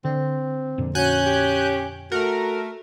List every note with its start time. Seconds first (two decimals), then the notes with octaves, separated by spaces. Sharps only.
0.05 D3 C4
0.78 F2 A#2 D3
0.95 C#4 F#4 G#5 F#6 G6
1.26 G4
2.12 A3 F#4 A#4